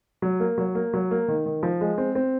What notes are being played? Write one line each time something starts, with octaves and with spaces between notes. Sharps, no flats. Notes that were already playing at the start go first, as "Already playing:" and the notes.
F#3
A#3
F#3
A#3
F#3
A#3
D#3
D#3
F3
G#3
C4
C4